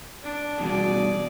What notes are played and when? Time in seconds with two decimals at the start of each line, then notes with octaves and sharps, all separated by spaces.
0.23 D4
0.60 E2 G2 B2 G#4 D5